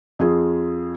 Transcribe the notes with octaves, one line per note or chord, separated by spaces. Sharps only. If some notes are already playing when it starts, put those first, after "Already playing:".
F2 F4 G#4